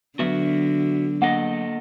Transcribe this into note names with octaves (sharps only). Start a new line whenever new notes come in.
D3 F#3 B3 F#4 E5
A#3 A4 D#5 F#5